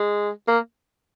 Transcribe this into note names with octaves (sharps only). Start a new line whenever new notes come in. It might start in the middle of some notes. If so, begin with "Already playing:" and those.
Already playing: G#3
A#3